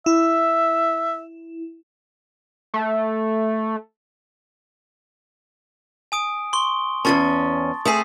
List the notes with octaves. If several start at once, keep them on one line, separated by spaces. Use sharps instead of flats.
E4 E5
A3
G#5 D#6 D7
C6 C#6 G7
E2 G#2 C#4 A5 C#6 A6
A3 C4 G#4 D#6 B6 C7